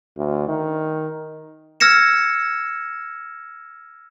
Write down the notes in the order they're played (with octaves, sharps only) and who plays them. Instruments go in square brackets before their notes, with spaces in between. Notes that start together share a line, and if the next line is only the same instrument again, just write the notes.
[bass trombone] D2
D#3
[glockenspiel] E6 F6 G#6 A#6 C#7 E7